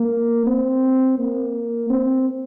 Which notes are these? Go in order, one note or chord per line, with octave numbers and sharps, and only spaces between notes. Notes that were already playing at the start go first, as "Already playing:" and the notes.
Already playing: A#3
C4
A#3
C4